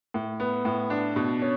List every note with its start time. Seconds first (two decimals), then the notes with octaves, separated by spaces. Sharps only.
0.14 A2
0.40 B3
0.65 A2
0.90 D4
1.16 B2
1.42 C#4